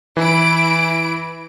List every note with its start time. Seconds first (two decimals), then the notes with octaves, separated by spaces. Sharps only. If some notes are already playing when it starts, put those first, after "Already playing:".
0.17 E3 E4 D7